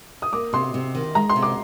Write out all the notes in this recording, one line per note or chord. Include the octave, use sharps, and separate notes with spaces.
D#6
A#3 D6
C3 C6
C3
D#3
G#3 A#5
C6
C3
D6